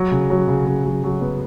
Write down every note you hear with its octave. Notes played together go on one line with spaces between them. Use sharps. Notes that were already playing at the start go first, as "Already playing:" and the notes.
Already playing: F#3
C#3
F#3
C#3
C#3
F#3
F#3
B3